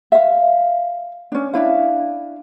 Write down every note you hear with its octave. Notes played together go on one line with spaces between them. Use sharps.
E5 F5
C#4 D4
D4 E4 F5